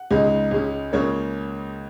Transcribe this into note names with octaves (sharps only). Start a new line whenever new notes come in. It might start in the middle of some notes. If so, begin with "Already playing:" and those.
Already playing: F#5
C#2 C#3 G#3 D#4
C#2 C#3 G#3 C#4
C#2 C#3 A#3 C#5